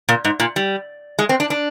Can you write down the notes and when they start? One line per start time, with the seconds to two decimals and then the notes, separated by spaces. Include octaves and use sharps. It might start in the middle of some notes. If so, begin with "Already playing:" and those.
0.09 A#2
0.25 G#2
0.40 A#2
0.56 G3
1.19 G#3
1.29 C4
1.40 D4
1.50 D4